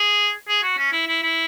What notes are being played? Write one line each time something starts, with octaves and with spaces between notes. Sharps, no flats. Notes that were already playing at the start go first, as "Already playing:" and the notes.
Already playing: G#4
G#4
F#4
C#4
E4
E4
E4